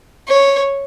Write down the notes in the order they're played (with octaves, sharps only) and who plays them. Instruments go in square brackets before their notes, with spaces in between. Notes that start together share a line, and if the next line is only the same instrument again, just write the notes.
[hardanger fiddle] C#5